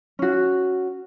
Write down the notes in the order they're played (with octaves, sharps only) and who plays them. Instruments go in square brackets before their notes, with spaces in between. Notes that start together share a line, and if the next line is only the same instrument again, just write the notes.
[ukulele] C#4 F#4